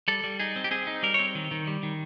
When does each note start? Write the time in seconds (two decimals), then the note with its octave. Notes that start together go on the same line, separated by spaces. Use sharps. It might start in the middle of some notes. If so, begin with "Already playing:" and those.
0.08 G3 A4
0.24 G3
0.40 D#4 G#4
0.56 C4
0.64 G4
0.71 C4 G#4
0.87 D#4
1.03 G3 A#4
1.14 C#5
1.19 C4
1.35 D#3
1.51 D#3
1.67 G3
1.83 D#3